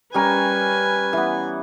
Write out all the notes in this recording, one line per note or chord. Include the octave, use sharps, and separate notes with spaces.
G3 C#4 A#4 B4 G#5
E3 B3